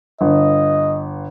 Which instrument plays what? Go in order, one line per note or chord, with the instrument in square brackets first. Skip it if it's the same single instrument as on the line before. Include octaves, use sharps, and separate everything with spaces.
[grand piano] G1 [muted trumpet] D#5